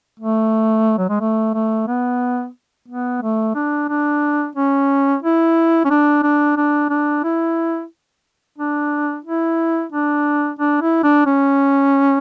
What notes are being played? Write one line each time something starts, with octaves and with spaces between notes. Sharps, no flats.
A3
F#3
G#3
A3
A3
B3
B3
A3
D4
D4
C#4
E4
C#4
D4
D4
D4
D4
E4
D4
E4
D4
D4
E4
D4
C#4